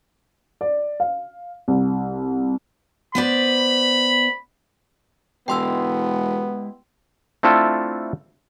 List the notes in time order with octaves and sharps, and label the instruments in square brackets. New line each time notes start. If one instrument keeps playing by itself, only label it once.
[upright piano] D5
F5
C2
[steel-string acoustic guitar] B3 C5 D5 [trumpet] B5
[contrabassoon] E1 [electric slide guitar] G#3 E4 G4 [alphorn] B3 [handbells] G5 C6 E6
[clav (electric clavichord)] A3 C4 D4 E4 F4 A4